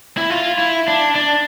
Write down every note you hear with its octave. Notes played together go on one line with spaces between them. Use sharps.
E4
F4
E4
D4
D4